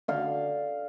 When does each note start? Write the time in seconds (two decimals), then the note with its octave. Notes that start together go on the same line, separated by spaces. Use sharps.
0.08 D3 F5